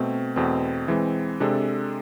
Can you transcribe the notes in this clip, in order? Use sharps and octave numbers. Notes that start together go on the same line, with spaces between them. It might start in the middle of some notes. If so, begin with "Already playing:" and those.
Already playing: B2 A3 C4
E2 B2 A3 C4
E3 G#3 C4
C3 G#3 D4 A4